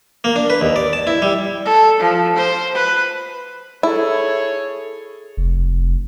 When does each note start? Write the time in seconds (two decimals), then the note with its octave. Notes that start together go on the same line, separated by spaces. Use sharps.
0.24 A#3
0.36 D4
0.50 B4
0.61 D#2
0.76 D5
0.93 A5
1.07 E4
1.22 G3
1.65 A4
2.00 F3
2.36 C5
2.75 B4
3.83 E4 G#4 A4 C#5
5.37 F1